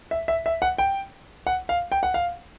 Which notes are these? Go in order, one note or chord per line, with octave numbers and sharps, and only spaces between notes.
E5
E5
E5
F#5
G5
F#5
F5
G5
F#5
F5